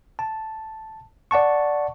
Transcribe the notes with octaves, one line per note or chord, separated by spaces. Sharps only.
A5
D5 F#5 A5 C#6